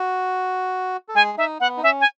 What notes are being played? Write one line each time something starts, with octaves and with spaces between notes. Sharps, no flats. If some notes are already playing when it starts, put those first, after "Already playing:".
Already playing: F#4
A4
G#3 G#4 G#5
D#4 E5
B3 F#5
D#4
C#4 E5
G#5